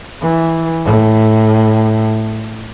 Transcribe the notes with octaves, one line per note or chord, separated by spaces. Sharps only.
E3
A2